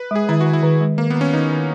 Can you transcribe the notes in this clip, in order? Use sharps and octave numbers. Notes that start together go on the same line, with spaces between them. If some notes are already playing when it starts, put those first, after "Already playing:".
Already playing: B4
G#3 G#4
D#3 E4
D#3 F#4
E4
D#3
G#3
D#3 A#3
B3
D#3 C#4
D#3 D#4
D#3